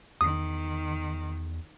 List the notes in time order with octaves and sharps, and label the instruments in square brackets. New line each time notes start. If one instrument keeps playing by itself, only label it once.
[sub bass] E2 [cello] D#3 [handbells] D#6